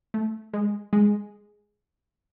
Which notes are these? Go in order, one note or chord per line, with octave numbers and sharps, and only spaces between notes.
A3
G#3
G#3